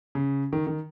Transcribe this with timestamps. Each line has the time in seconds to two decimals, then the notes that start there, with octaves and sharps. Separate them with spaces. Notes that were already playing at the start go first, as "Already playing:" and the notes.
0.15 C#3
0.53 D#3
0.67 D#3